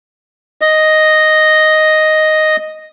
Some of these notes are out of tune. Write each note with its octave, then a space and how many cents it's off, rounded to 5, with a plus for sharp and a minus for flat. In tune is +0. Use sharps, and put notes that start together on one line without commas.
D#5 +0